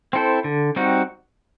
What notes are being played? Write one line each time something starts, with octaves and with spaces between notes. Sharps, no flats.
C4 E4 A4 C5
D3
G3 C4 D#4 F#4